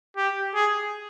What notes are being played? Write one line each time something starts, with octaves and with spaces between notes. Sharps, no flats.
G4
G#4